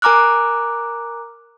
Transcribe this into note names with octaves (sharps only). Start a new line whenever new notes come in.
A#4 G#5 A#5 D6 F6 F#6